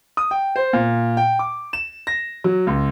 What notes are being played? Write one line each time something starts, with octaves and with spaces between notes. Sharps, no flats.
D#6
G5
C5
A#2
G5
D6
E7
A#6
F#3
C#2